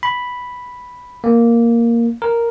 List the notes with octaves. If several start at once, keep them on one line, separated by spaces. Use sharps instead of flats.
B5
A#3
A#4